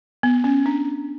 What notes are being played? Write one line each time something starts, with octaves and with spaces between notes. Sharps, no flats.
B3
C#4
D4